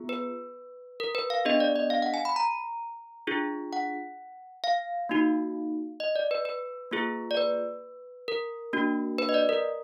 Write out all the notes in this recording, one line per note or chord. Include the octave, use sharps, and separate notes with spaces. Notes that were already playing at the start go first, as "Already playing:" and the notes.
Already playing: B3 F4 G#4
B4
A#4
B4
F5
B3 D4 G#4 D#5
D5
D#5
F5
F#5
G#5
B5
A#5
D4 F4 G#4
F#5
F5
A#3 D#4 F#4
D#5
D5
B4
B4
A#3 F4 G#4
D5
B4
A#4
A#3 D4 F#4
B4
D#5
D5
A#4